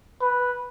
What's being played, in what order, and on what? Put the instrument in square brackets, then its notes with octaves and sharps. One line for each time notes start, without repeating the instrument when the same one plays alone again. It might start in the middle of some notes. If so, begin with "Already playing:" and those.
[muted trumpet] B4